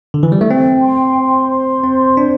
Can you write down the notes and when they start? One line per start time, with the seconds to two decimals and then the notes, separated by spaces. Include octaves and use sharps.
0.14 D3
0.23 E3
0.32 G3
0.41 A3
0.50 C4 G5
0.83 C6
1.17 C5
1.50 C6
1.84 C4 C5
2.17 D4 C5